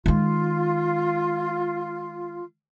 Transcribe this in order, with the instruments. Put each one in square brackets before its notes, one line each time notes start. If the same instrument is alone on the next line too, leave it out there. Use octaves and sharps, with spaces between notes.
[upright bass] D#3 G#3 [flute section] F4